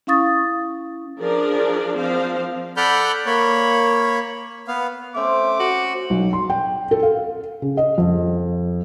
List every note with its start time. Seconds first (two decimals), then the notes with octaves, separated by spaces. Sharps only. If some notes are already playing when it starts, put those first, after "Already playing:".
0.07 C#4 E4 F5 C#6 D#6 A6
1.20 F3 D4 G#4 A#4 D5
1.97 F3 C4 C5 F5
2.77 A4 D5 F#5 B5 F6 G6
3.26 A#3 C#5 B5
4.68 B3 F5
5.16 A3 C4 C#4 C5 D6
5.60 F#4
6.10 B1
6.33 C6
6.50 G5
6.91 A4
7.03 F5
7.62 C#3
7.77 D#5
7.98 F2